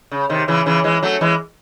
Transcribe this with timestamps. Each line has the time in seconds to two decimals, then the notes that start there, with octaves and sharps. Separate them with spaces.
0.11 C#3
0.30 C3 D#3
0.48 C#3 E3
0.66 C#3 E3
0.84 E3 G#3
1.02 F#3 A3
1.21 E3 G#3